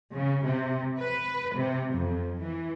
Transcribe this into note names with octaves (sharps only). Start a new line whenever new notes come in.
C#3
C3
B4
C3
F2
E3